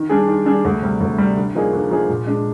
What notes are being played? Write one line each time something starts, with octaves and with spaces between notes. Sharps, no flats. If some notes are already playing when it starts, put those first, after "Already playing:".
Already playing: D#3
G3 D4 G#4
D#3
G3 D4 G#4
D2
C3 G3
D2
C3 G3
D3
F3 A#3 D#4 G#4
D3
F3 A#3 D#4 G#4
A#2
G#3 D4